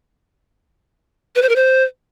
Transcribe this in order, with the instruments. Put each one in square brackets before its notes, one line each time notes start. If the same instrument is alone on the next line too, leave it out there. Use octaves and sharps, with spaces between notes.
[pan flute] B4
C5
A#4
C5